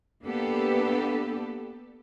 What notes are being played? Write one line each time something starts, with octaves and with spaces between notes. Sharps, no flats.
A#3 B3 D4 G4 A4 B4